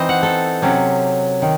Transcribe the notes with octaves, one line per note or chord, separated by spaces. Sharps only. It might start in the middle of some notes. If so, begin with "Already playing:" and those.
Already playing: E3 C4 D#4 C5 D#5
F#5
A4
C3 F#3 C#4
D#3